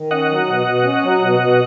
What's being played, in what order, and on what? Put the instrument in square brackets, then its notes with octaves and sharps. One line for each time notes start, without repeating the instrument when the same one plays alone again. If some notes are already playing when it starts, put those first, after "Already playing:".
Already playing: [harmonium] D#3
[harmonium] C#4 [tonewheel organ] D#5 F#5
[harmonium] F#3
B2
B2
C#4
F#3
B2
B2